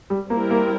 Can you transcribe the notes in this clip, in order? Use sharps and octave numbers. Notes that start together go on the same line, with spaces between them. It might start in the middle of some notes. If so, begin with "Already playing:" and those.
G3
G3 A#3 C4 E4 A#4
A#3